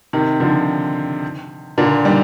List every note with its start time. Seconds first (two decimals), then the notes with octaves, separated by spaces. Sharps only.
0.13 C3 D#3
0.40 D3 F3
1.78 A#2 D3
2.05 D#3 G3